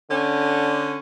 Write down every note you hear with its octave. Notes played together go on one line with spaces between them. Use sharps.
D3 C#4